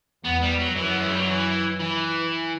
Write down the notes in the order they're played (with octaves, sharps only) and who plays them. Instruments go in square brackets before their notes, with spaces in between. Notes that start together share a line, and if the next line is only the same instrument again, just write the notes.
[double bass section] E2 [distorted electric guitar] B3
[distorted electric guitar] G3
F#3
[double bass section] F#2 [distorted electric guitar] E3
[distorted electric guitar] B3
A3
G3
F#3
E3
E3